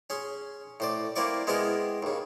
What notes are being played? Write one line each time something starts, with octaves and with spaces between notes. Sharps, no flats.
C#4 G#4 C6
A2 C5 D5
A#3 C4 E4 D5 C#6
G#3 B3 C4 E4 G#4 A#4
D#2 C#3